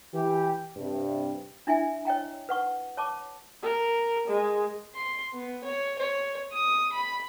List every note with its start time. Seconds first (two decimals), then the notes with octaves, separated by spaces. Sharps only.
0.14 E3 G4
0.76 G2 C3
1.67 D4 E4 E5 G#5
2.05 C#5 D#5 G5 A#5
2.49 B4 F#5 C#6
2.97 C#5 A5 C#6 D6
3.63 A#4
4.28 G#3
4.94 C6
5.34 B3
5.64 C#5
5.99 C#5
6.52 D#6
6.92 B5